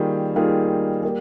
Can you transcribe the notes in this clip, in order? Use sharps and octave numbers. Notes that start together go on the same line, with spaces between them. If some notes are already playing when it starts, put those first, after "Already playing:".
Already playing: D#3 G3 A#3 F4 G#4
D#3 G3 A#3 F4 G#4
G3 A#3